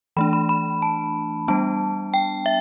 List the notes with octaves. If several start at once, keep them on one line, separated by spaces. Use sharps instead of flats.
E3 A3 D4 B5
B5
B5
A5
G3 B3 D4 A5
G5
E5